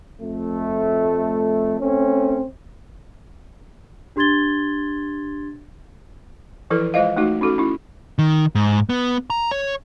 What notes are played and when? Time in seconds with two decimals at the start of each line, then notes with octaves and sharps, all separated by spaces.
0.21 F2 A3
1.80 A3 C4 C#4
4.16 D4 G4 C6 G#6 A6 G7
6.70 E3 F3 E4 A4 B4
6.94 G#3 F4 C5 D#5 F5
7.17 A3 D#4 F#4
7.41 C#4 D#4 F#4 A4
7.58 C#4 E4
8.19 D#3
8.55 G#2
8.89 B3
9.30 A#5
9.52 C#5